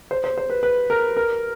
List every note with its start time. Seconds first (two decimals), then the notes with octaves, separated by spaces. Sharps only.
0.11 C5
0.24 C5
0.38 C5
0.50 B4
0.63 B4
0.90 A#4
1.17 A#4